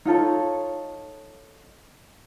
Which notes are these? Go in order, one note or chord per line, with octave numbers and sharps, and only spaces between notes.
D#4 F4 A4 C#5